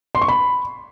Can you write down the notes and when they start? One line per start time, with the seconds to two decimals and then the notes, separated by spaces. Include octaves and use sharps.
0.15 C6
0.21 C#6
0.28 B5